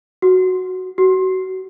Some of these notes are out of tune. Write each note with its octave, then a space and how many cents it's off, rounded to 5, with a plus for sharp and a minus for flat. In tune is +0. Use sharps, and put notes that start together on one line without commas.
F#4 +0
F#4 +25